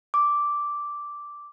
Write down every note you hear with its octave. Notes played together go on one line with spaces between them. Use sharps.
D6